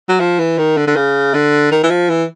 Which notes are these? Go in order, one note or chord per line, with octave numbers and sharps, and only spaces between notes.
F#3
F3
E3
D#3
D3
D3
C#3
D3
D#3
E3
F3
E3